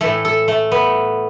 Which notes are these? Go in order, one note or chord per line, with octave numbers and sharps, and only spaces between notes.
A2 E3 A3 A4
A4
A3
B3